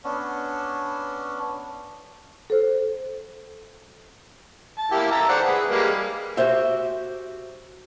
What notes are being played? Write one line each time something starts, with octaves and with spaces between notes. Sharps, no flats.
B3 C#4 D4
A4 C5
A5
A#3 E4 G4
E5 A5 A#5
C5 D5 F#5
G#4 B4
G3 G#3 A#3
F#4 G4 C5 E5